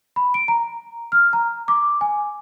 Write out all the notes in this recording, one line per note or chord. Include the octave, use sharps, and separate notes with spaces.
B5
D7
A#5
F6
A#5
D6
G#5